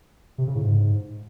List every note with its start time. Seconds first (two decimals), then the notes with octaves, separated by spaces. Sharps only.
0.38 C3
0.47 C#3
0.55 A2
0.64 G#2